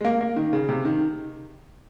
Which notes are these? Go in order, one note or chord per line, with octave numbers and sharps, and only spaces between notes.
G#3
A#3
A#3
D#3
C#3
C3
D#3